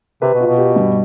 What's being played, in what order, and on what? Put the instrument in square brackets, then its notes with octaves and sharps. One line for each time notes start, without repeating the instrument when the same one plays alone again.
[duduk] C3 [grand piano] B4
[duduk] B2
[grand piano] F4
[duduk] B2
[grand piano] G4
G2